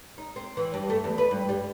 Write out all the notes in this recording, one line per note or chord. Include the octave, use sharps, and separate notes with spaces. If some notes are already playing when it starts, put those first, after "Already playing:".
D#4
C4
E3
G2
A3
E2
B4
G2
G3